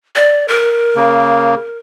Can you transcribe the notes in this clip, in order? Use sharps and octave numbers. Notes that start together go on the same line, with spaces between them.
D5
A#4
C#3 A#3